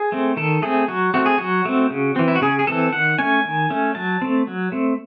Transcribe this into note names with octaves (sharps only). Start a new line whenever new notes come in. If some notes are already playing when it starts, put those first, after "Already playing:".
Already playing: G#4
A3 C4
D#3 A4
A3 C4 G#4
F#3 F#4
A3 C4 F#4
G#4
F#3 F#4
A3 C4
C#3
E3 C4
E4
F#4
C#3 G#4
G#4
E3 C4 A4
D#3 F#5
A3 C#4 G#5
D#3
A3 C#4
F#3 A5
A3 C4
F#3
A3 C4